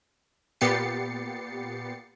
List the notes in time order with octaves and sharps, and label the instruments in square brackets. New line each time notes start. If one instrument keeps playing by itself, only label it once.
[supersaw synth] A#2 B3 G4 A6 C7 C#7